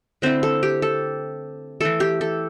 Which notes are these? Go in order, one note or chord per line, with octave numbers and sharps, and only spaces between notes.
D3 A3 C4 E4 C5
A4
G4
A4
E3 A3 E4 A4
G4
A4